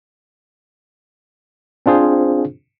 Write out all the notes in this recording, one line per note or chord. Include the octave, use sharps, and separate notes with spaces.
C4 D4 F4 G#4 C5